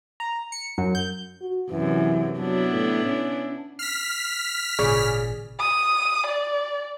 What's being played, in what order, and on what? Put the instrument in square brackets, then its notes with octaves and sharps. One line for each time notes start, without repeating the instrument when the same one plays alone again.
[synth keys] A#5
C#7
F#2
G6
[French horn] F#4
[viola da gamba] F#2 C3 [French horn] E3
[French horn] F#3 [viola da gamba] B3 D4 E4
[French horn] A2
C#4
[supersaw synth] F6 B6 [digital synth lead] C7
[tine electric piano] G#1 A#2 [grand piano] C#3 D5 C#6 [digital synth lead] G#4
[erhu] D#6
D5